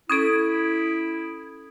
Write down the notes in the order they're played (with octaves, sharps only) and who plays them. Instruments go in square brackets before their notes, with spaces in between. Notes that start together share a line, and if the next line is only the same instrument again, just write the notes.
[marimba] C#4 A4 [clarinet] E4 [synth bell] D#6 G#6 D7